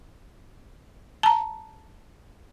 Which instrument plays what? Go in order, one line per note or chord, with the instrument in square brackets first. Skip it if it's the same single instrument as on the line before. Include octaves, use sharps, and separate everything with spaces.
[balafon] A5 A#5